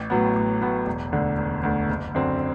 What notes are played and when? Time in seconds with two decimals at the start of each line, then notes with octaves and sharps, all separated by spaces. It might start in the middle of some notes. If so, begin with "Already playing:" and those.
Already playing: A1
0.10 A2 F#3 B3
0.35 A1
0.61 A2 F#3 B3
0.86 E1
1.12 D2 D3
1.38 E1
1.63 D2 D3
1.89 F#1
2.15 F#2 D3 F#3 C4